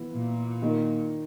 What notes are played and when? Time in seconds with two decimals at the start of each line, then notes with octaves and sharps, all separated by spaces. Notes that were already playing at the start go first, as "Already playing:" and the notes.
Already playing: E3 B3 E4
0.12 A#2
0.62 D#3 A#3 D#4